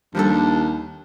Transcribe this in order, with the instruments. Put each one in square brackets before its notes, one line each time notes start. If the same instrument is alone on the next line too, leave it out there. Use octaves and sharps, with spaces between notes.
[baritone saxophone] D#2 [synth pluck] F3 G3 A4 [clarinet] D4